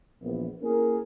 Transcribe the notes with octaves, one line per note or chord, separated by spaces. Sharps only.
A#1 E2 B3
A#3 C#4 E4 G#4 A#4